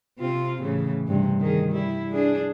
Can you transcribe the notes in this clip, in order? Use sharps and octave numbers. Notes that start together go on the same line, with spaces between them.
C3 C4 F4
A2 C#3 E3
G2 C3
D#3 G#4
G3 E4
D4 G#4